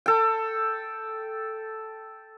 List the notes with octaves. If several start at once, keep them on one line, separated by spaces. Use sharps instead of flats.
A4 G5